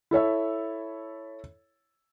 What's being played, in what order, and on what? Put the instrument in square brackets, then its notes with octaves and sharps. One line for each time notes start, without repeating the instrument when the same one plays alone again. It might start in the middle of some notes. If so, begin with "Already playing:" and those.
[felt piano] E4 A4 C#5 E5